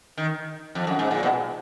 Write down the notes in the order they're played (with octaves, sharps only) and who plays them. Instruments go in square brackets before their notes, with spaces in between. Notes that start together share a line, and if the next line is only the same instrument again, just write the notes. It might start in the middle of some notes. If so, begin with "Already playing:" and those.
[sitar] D#3
F2
F#2
G#2
A#2
B2